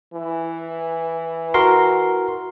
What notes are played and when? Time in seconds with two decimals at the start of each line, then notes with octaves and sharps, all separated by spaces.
0.14 E3
1.54 F#4 A#4 C6